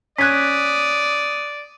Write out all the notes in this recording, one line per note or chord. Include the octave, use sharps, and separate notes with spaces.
C#4 D5 D#6 F#6 G#6 B6